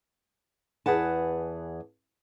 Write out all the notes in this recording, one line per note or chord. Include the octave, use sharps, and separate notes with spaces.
E2 G#4 B4 F#5 A5